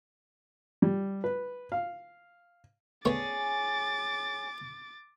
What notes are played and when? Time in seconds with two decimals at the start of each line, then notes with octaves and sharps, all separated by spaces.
0.82 G3
1.24 B4
1.72 F5
3.05 A3 B3 C#4 G#4 C#5 D6 A6